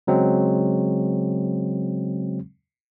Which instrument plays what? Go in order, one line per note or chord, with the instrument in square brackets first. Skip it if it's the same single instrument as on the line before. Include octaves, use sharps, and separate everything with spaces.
[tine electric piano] C#3 F#3 G#3 C4